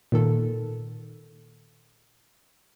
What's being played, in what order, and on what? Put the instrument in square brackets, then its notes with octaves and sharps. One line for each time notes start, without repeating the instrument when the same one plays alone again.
[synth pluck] A#2 D#3 A4